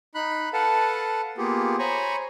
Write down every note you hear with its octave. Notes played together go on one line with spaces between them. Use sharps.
D#4 B5 F#6
A4 B4 F5 F#5 A5
A#3 B3 F4 G4 G#4
C5 C#5 G#5 A#5 B5 C#6